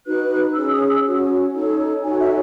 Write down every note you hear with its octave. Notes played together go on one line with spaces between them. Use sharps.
D#4 F#4 B4 F#6
C#4 G#4 C#5 E6
D#6
E6
C#4 F#4 C#5
D#4 A4 C#5
D#4 F#4 A4 C#5 G#5
E5